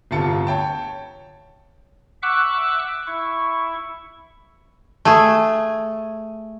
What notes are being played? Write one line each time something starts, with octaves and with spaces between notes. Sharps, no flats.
D1 G1 C3 F4 A5 C#7
C#5 G5 A5
E5 F#5 C#6 D6 E6 F#6
E4 C#6
A3 G#4